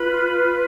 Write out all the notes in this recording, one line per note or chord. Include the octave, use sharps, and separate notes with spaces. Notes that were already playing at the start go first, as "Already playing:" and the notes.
Already playing: F4 B4 B5